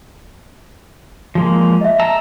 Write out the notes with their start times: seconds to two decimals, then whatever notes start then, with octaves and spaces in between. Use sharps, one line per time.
1.35 F3 G#3 A#3
1.81 D#5 E5
2.00 A5 A#5 E6